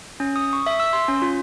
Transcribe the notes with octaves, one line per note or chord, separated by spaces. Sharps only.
C#4
D#6
C#6
E5
E6
C6
C#4
F4